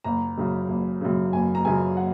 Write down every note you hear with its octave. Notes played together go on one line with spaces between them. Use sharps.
F#1 A#5
F#2 C#3
F#1
F#2 C#3
F#1 G#5
A#5
F#2 C#3 G#5
F#5